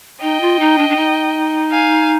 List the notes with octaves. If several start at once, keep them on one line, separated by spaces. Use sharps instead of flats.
D#4 D#5 G5
F4
D#4
D4
D4
D#4
F5 G#5